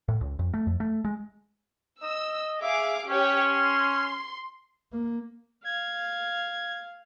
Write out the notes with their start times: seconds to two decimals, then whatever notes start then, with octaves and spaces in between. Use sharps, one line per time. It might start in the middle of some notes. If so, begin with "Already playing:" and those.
0.08 A2
0.21 C#2
0.39 F2
0.54 A3
0.67 F2
0.80 A3
1.05 G#3
2.03 D#5 E6
2.62 G#4 E5 F5 D6
3.07 C#4 G4 C#5
3.45 C6
4.92 A#3
5.64 F5 G#6